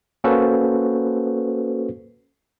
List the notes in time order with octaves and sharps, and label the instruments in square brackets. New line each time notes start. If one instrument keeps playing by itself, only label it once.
[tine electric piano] A#3 C#4 F#4 A4 B4 C5